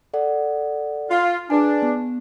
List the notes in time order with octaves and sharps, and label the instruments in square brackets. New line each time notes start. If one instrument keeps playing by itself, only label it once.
[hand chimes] A4 D5 F#5
[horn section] F4
[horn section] D4 [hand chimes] G#4 B4 G#5
[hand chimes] B3